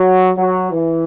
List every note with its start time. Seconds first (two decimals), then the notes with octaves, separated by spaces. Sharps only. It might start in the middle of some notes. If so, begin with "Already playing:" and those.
Already playing: F#3
0.37 F#3
0.72 E3